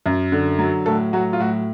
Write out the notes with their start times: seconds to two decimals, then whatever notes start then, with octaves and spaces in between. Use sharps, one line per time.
0.06 F#2
0.32 D3
0.59 F#3
0.86 A2 A4
1.13 F#3 F#4
1.33 F4
1.39 A2 F#4